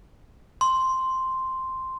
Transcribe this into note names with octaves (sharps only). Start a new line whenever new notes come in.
C6